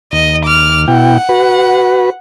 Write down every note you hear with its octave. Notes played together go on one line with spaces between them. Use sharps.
D#2 D#5
D6 F6
B2 E4 F#5 G5
F#4 B4